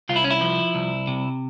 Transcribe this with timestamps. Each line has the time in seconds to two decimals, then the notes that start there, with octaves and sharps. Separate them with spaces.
0.09 C2 F4
0.16 E4
0.24 C#4
0.31 E4
0.41 F3
0.75 C2
1.07 C3